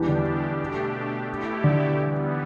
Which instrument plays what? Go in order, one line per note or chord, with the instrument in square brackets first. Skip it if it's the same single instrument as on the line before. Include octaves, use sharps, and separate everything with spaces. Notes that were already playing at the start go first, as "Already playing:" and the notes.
Already playing: [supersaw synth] E2 B2 G3 D4 G4 [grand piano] E3
[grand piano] D3
[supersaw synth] B2 A3 D4 G4
B2 A3 E4 G4
[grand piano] D3
[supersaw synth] E3 G3 B3